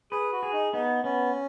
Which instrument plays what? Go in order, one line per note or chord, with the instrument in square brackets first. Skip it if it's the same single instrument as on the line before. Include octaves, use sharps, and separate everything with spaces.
[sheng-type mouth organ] G#4 [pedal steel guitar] B4
[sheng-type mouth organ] F#4
[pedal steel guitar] G#4
[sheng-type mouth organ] D#4
[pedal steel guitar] B3 [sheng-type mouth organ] D#4
[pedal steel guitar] B3 [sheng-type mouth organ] C#4